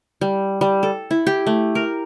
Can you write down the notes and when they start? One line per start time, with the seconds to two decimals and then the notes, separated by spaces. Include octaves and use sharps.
0.21 G3
0.61 G3
0.83 A4
1.11 E4
1.27 G4
1.47 A3
1.75 A#4